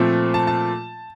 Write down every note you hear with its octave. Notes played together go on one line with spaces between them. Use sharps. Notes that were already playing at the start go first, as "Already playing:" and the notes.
Already playing: A#2 F3 A3 C4
A5
A5